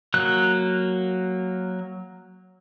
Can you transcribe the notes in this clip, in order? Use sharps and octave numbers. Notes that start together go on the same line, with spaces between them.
F#3 A#3 F#6